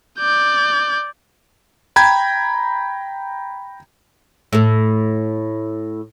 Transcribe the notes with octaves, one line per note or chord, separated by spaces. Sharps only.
D5 G6
G5 A#5 B5 G6 G#6
A2 A4